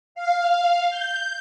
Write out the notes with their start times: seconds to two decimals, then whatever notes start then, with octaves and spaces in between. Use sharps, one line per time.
0.15 F5
0.90 G6